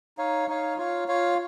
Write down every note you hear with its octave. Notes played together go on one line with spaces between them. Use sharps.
D#4 C#5 F5
D#4 C#5 F5
F4 C#5 F5
F4 C#5 F5